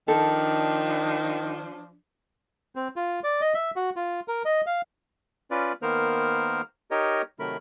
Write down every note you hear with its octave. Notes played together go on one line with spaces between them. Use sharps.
D#3 F3 D4 A4
C4
F4
D5
D#5
E5
F#4
F4
A#4
D#5
F5
C#4 F4 B4 D5
D#3 A#3 B3 A#4 C5 F6
D#4 G4 A#4 C#5 D#5
C3 D#3 F#3 A3 A#4 B5